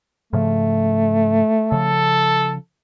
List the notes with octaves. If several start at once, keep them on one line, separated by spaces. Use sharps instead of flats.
G#2 C#3 F3 A3
C#3 F3 A4